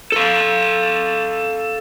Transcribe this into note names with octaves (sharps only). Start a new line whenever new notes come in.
A4 F5